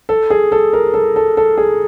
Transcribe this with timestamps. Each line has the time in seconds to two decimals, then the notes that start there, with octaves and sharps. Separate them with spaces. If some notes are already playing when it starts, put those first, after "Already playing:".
0.09 A4
0.30 G#4
0.52 A4
0.73 A#4
0.94 A4
1.16 A4
1.37 A4
1.58 G#4